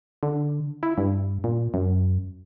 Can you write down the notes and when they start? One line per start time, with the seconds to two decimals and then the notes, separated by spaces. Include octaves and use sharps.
0.23 D3
0.83 E4
0.98 G2
1.44 A#2
1.74 F#2